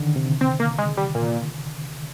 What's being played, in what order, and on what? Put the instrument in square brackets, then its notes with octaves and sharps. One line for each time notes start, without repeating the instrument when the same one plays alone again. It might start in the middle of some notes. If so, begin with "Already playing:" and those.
Already playing: [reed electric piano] D3 D#3
C3
[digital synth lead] C4
A#3
G#3
G3
A#2